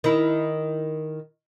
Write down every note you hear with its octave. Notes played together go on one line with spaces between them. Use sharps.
D#3 E4